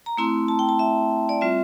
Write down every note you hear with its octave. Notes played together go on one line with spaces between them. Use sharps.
A#5
A3 C4 E4 C6
A5
G5
A5
E5
D5
G3 C4 F4 E5